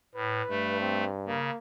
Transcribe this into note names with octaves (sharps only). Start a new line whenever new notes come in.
A2 B4
G2 A3
C4
C#3 A#3